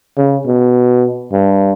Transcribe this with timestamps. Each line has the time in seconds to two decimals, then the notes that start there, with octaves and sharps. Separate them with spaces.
0.18 C#3
0.47 B2
1.32 G2